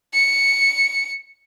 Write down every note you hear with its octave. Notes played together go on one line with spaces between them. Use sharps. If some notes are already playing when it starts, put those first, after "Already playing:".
C#7